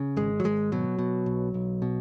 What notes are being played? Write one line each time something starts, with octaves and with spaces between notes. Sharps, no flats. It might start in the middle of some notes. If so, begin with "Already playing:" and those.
Already playing: C#3
G#1 G#3
F#3
G#1 G#3
B2 F#3
B2
B1
B1
B2